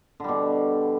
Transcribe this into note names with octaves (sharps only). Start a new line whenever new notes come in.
B2 D3 G3